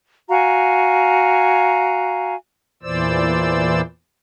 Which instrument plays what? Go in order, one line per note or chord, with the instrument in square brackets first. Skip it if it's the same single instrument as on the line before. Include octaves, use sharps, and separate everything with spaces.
[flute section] F#4 F5 G#5 A#5
[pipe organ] E2 A#2 E3 C5 D5 E6